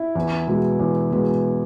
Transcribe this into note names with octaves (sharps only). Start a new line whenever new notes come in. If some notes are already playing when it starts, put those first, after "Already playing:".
Already playing: E4
E2
B2 G#3 B3
E2
B2 G#3 B3